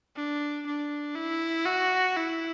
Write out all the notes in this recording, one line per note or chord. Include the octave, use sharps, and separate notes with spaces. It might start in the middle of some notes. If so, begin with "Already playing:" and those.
D4
D4
E4
F#4
E4